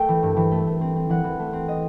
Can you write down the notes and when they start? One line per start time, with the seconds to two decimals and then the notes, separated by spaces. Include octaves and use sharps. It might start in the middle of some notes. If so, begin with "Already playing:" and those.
Already playing: A3 G5
0.08 E3
0.23 G2
0.36 E3
0.51 A3
0.67 A3
0.81 C4
0.96 C4
1.10 E3 F#5
1.24 E3
1.39 A3
1.53 C4
1.68 D#5